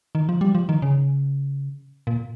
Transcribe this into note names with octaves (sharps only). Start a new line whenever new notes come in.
D#3
F3
G3
F3
D#3
C#3
A#2